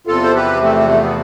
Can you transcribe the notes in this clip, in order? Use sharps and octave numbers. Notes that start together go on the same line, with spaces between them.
E2 C3 F3 F4 A4
C5
G4 B4
A3 C4
A3
B3